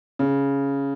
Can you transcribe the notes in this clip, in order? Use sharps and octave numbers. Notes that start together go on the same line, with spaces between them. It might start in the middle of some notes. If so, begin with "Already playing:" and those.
C#3